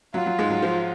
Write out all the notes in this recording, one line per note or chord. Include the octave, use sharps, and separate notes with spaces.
F#3 F4
F#3
G#2 G#3
F#3
F3